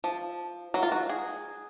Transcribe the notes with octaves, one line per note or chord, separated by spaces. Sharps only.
F3
F#3
F4
F#4
G#4